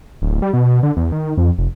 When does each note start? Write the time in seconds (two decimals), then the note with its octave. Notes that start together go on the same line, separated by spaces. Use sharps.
0.22 D1
0.42 G3
0.53 B2
0.83 D3
0.97 E2
1.12 D#3
1.37 F2
1.58 F1